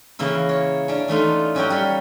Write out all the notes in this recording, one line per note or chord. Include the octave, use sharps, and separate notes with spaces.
C#3 E3 A#3 E4
C#5
C#4 D4
E3 A3 D#4 F4
F#3 C#4 F#4 G4 A#4 G5
G3 C#5 F5